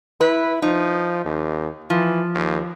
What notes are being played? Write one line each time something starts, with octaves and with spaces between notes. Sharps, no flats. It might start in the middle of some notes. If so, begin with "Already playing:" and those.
E4 B4
F3 D#4
D#2
E3 F3
D#2